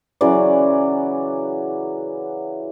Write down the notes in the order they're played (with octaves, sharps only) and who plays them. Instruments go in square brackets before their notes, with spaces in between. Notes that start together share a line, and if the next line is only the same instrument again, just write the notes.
[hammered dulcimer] C#3 E3 F#3 D5